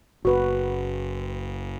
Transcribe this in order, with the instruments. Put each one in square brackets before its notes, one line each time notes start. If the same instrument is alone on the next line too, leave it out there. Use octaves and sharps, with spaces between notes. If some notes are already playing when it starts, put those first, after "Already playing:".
[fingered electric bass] F#1 [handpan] F#4 B4